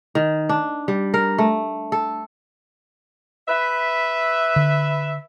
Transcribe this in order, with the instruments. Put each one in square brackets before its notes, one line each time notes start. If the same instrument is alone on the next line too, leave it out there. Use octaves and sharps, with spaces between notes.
[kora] D#3
D4
G3
A#4
A3
A4
[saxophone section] B4 E5
[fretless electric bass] D3